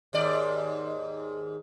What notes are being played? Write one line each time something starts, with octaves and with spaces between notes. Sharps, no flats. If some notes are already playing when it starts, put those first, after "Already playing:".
D#2 G#2 D5